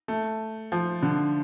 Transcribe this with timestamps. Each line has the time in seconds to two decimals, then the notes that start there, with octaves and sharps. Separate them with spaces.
0.08 A3
0.72 F3
1.03 D3